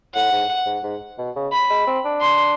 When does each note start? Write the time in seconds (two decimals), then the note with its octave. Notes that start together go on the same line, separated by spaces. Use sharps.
0.15 A2 F#5
0.32 G#2
0.66 G#2
0.83 G#2
1.18 B2
1.36 C#3
1.53 B5
1.70 G#3
1.87 C4
2.05 D4
2.21 C6